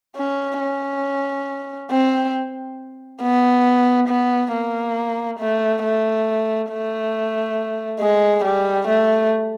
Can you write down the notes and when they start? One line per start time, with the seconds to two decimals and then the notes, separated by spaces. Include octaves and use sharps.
0.17 C#4
0.60 C#4
1.91 C4
3.22 B3
4.08 B3
4.52 A#3
5.39 A3
5.83 A3
6.70 A3
8.00 G#3
8.44 G3
8.88 A3